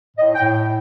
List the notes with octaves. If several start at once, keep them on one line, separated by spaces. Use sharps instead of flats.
A2 D#5
G5
A2